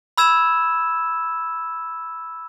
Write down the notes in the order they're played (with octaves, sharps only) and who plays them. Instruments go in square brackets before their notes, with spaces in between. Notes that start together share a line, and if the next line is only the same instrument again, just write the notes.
[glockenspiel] B5 E6 G#6 E7